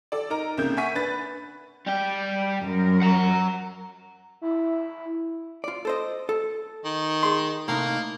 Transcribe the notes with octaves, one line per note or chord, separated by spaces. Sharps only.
A4 D5
D#4 A#4 A#5
C2 C#3 A#3 G6
E5 F#5 G#5 C#6 B6 D#7
D4 B4 F#6 A6
G3 G5
F#2 A#4
F#5 A#5
E4
F4 D5
A4 C5 D#5
A4
D#3
G#4 C6
A2 C3 A#3 D#4